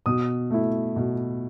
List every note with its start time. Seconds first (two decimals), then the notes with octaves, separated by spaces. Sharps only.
0.06 B2 D#6
0.51 A3 E4
0.96 B2